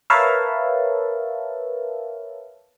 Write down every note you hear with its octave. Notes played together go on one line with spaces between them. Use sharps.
A#4 B4 C#5 E5 F5 A5